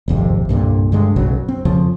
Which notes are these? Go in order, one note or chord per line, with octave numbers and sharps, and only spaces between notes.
D#1 G#1 F2 C3
C2 G2 A#2 D3
G2 D3 G#3
F#1 B1 C#3 F#3
C4
F2 C#3 F3